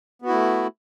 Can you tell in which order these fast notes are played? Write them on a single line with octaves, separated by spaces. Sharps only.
B3 F#4 E4 A3